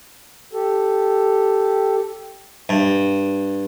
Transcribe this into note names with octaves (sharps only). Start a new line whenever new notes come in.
G4 A4
G2